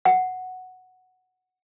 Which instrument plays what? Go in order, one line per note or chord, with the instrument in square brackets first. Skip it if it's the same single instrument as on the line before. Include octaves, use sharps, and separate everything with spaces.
[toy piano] F#5